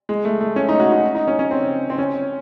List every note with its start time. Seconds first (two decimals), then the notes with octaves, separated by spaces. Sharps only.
0.09 G#3
0.25 A3
0.41 A3
0.56 C#4
0.69 D#4
0.80 F#4
0.92 D#4
1.15 D#4
1.28 C#4
1.39 C#4
1.51 C4
1.90 C4
1.98 C#4